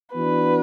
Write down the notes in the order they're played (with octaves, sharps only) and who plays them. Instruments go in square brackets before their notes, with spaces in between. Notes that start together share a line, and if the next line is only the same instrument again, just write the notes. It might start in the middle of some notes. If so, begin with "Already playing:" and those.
[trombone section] E3 B3 D4 F#4 [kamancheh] B4